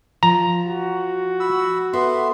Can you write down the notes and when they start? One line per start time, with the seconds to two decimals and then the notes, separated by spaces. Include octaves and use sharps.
0.23 F3 A#5
0.68 F#4
1.40 B5 E6
1.93 B3 A4 E5 C6